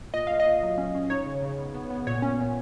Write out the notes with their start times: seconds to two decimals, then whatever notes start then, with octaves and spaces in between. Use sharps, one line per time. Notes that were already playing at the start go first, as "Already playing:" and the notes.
0.14 A#2 D#5
0.27 A#2 F5
0.40 D#5
0.46 A#2
0.63 F#3
0.78 C#4
0.95 C#4
1.10 D#4 C#5
1.26 C#3
1.42 C#3
1.58 B3
1.74 B3
1.90 B3
2.07 A#2 C#5
2.22 C#4
2.40 A#2